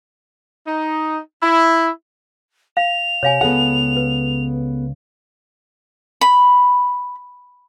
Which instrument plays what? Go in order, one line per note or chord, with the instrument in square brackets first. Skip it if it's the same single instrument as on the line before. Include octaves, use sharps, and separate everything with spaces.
[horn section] D#4
E4
[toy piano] F5 [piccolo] F7
[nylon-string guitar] C3 [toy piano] C#5 F5 G#5
[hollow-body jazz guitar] C#2 F#5 [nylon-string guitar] B3 G#4 A4
[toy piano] B4
[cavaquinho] B5